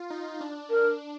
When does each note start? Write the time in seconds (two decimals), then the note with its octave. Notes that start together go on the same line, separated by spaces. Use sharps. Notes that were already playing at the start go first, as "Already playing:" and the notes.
Already playing: F4
0.10 D#4
0.41 D4
0.71 A#4